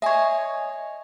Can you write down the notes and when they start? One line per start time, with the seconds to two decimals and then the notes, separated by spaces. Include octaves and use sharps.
0.02 C#5 D#5 E5 G#5